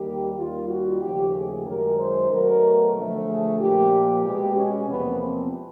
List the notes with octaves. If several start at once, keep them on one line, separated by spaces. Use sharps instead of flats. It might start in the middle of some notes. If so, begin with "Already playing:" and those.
Already playing: D#2 D#3 G3 A#3 G4
D#2 D#3 G3 A#3 F4
F#4
D#2 C#3 F3 A3 G4
G#4
F#2 D#3 G#3 A#4
C5
B2 F#3 A3 A#4
D2 D3 F3 A3
G#4
A#2 F3 A#3 G4
B2 G#3 G4
C#4
E2 C3 F3 A#3 B3
C4